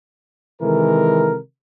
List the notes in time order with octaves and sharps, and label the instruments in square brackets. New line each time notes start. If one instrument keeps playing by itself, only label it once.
[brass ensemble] C3 D#3 E3 G#3 A4 A#4